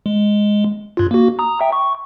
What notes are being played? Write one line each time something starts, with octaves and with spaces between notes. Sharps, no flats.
G#3
G2 F4
A#3 F#4
A#5 D#6
E5 G5
C#6